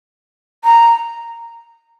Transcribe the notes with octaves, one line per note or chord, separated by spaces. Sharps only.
A#5